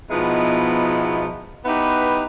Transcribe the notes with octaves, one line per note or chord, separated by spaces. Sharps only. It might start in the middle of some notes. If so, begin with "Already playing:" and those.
B2 F3 G#3 B3 D#4 E4
B3 D#4 E4 G4 B4